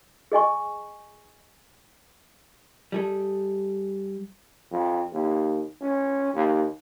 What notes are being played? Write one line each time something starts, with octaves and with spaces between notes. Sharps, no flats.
G#4 D#5 G#5 C#6
G3 G#4 A4
F2
D#2
C#4
D#2